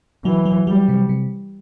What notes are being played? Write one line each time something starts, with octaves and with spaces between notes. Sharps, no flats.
E3 F#3
F#3
F#3 G3
C3
C3